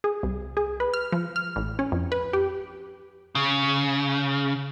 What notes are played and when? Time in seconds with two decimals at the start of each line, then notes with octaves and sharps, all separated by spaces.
0.04 G#4
0.23 C2
0.57 G#4
0.80 B4
0.94 F6
1.12 F3
1.36 F6
1.56 A1
1.79 C#4
1.92 F2
2.12 B4
2.33 G4
3.35 C#3